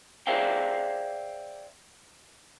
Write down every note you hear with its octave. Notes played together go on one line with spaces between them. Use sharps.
G#4 C5 D5 E5 F5 G5